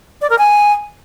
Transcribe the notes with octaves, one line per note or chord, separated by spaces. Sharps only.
D5
A#4
G#5